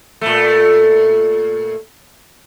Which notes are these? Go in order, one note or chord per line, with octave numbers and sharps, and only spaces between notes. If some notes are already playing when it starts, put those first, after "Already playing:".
A#2 A3